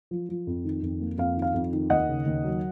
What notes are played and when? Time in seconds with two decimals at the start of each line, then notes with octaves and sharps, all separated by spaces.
0.11 F3
0.29 F3
0.47 F2
0.65 D#3
0.82 F2
1.00 A#3
1.18 F2 F5
1.37 D#3
1.42 F5
1.54 F2
1.73 D#3
1.90 D#2 D#5 F#5
2.09 C#3
2.26 D#2
2.44 F#3